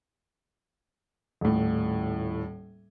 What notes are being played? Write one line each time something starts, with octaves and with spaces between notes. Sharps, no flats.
D#1 A2